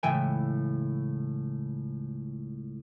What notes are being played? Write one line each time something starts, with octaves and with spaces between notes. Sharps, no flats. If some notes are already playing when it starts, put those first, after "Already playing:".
C#2 A2 E3 E5 G5 G#5